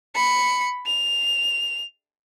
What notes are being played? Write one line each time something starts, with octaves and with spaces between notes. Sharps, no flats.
B5 C#7
F7